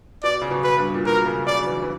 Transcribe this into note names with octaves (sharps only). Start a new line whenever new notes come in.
B2 D5
C#3
B2
B4
G2
A#2
B2 A#4
C#3
C#3 D5
F#3
E3
E3